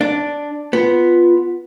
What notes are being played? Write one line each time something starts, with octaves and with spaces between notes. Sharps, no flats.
D4
B3 F4